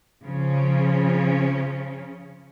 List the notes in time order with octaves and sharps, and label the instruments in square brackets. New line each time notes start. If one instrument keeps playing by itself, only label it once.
[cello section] C#3 F3 C#4